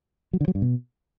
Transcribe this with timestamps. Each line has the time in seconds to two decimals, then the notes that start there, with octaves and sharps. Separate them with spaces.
0.33 F#3
0.41 D3
0.48 F#3
0.55 G2
0.62 B2